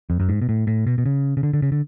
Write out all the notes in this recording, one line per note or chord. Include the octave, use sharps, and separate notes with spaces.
F2
F#2
G#2
B2
A2
A2
B2
B2
C#3
C#3
D3
D3
C#3
D3